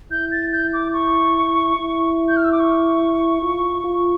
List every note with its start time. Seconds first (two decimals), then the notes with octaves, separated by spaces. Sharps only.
0.11 E4 G6
0.32 A6
0.52 G6
0.74 D6
0.94 C#6
1.76 E4
2.28 G6
2.37 F6
2.44 E6
2.52 D6
2.60 C#6
3.42 F4
3.84 F4